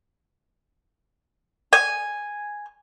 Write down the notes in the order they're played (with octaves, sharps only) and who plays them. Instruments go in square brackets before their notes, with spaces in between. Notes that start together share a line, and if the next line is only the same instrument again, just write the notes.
[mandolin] G#5